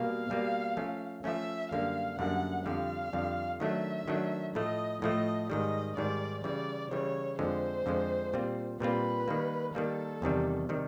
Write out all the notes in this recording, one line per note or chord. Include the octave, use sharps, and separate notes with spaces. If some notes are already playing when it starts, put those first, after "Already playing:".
Already playing: B2 G3 A#3 F5
B2 G3 A#3
F3 A3 C#4
F3 A3 C#4 E5
F#2 D3 G3 A#3 D4 F5
F#2 D3 G3 A#3 D4 F#5
F2 D3 G3 F5
F2 D3 G3
D#3 F#3 A3 D4 E5
D#3 F#3 A3 D4
A2 F3 A3 D#5
A2 F3 A3 D#5
G#2 D#3 G3 D#5
G#2 D#3 G3 D5
C#3 E3 G3 D5
C#3 E3 G3 C#5
F2 D3 F3 G#3 C5
F2 D3 F3 G#3
A#2 G3 C4 F4
A#2 G3 C4 F4 B4
D#3 G3 A#3
D#3 G3 A#3 A4
E2 C3 D#3 G3
C3 D#3 G3